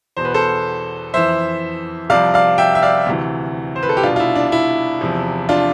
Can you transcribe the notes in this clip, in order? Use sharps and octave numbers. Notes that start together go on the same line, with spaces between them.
E2 B2 C5
B4
A4 C5
F2 E3 C5 E5
C2 C3 F3 D5 F5
D5 F5
E5 G5
E5
D5 F5
D2 C3 E3
C5
B4
A4
G4
C2 B2 D4 F4
F4
E4
D4
D4
E4
E2 C3 F3
D4 F4